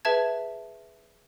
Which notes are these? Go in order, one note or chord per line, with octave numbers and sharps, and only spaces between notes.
G#4 B4 E5 A5 G#6